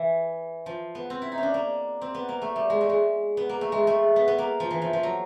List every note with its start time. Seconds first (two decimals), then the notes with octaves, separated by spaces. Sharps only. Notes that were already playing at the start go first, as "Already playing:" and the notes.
Already playing: E3
0.66 F3
0.95 B3
1.10 C4
1.22 E4
1.32 D#4
1.38 C#4
1.43 D4
1.54 A#3
2.01 C4
2.15 B3
2.29 A#3
2.42 A3
2.56 G3
2.70 G#3
2.81 A3
2.89 G#3
3.37 B3
3.49 A#3
3.61 A3
3.72 G#3
3.87 A3
4.16 B3
4.28 B3
4.38 A#3
4.60 F3
4.71 E3
4.82 F3
4.93 F3
5.03 F#3